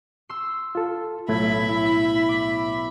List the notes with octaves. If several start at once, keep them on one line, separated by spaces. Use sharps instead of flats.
C6 E6
F4 A4
B1 A2 A3 E5 B5 G#6
E4
D6